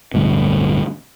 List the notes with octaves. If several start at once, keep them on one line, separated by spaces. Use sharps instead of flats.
D1 D2 G2 B2